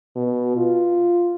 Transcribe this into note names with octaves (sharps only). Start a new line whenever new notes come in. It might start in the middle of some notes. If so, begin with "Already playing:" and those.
B2
F4